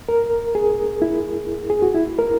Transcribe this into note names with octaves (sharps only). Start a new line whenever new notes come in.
A#4
G#4
E4
G#4
F#4
E4
A#4